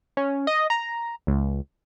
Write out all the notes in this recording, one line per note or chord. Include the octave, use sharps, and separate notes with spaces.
C#4
D#5
A#5
C#2